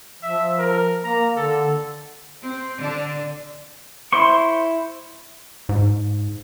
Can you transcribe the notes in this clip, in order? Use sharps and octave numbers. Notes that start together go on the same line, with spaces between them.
F3 E5
A#4
A#3 A#5
D3 A4
C4
D3 D4
E4 C5 C6 C#6
G#2